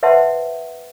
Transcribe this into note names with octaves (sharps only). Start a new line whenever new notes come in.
B4 C5 E5 F#5 A5 C6